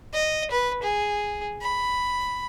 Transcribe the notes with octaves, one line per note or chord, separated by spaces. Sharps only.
D#5
B4
G#4
B5